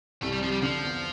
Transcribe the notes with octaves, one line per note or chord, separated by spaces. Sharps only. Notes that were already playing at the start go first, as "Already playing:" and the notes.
C2 A3
G3
C3 F3
G3
D3 F3
E2